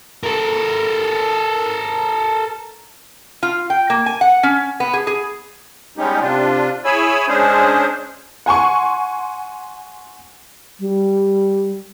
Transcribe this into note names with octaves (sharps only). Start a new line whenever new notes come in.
A4 A#4
F4
G5
A#3
G#5
F#5
C#4
B3
G#4
G#4
G3 G#3 B3 C#4 D#4 G4
C3 D4 F4
E4 G#4 C#5 G#5 B5 E6
G#3 C#4 D4 G#4 C5
F#5 G#5 C6 C#6
G3